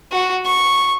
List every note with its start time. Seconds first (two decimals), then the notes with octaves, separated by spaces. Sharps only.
0.12 F#4
0.45 C#6